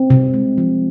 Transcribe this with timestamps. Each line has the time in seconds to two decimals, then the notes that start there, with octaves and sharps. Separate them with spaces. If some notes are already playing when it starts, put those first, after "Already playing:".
Already playing: C4
0.10 C3
0.34 G#3
0.58 F3